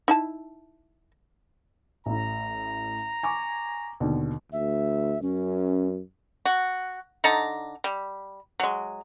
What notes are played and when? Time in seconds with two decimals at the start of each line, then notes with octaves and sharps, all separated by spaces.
0.08 D#4 E4 A5
2.06 A1 A2 A#5
3.23 G#5 C#6 D6
4.00 D#2 B2 D3
4.52 D2 E5
5.22 F#2 C#4
6.45 F#4
7.24 D3 D#4 A5 A#5
7.84 G3
8.60 F#3 G#3